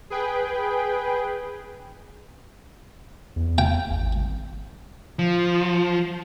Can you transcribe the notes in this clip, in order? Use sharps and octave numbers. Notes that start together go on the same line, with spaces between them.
G#4 B4 G5
E2
G5
G#1
F3